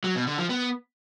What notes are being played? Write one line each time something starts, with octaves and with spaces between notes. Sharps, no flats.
F#3
B2
D3
F3
B3